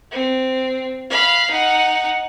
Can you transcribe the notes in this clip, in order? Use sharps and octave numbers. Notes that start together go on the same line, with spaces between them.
C4
F5 B5
D#4 F#5